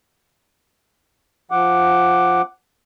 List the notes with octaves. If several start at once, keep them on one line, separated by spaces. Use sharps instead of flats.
F3 F#5 D6